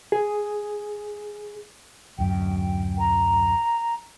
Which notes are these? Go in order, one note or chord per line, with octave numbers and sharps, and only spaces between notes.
G#4
D1 F#2 G5
A#5